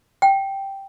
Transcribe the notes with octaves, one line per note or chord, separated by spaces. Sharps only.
G5